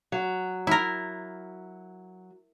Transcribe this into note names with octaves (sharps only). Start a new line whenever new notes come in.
F#3
E4 A#4